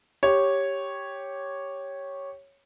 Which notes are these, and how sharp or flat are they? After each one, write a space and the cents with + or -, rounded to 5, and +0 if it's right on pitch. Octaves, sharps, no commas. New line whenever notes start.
G4 +0 C#5 -5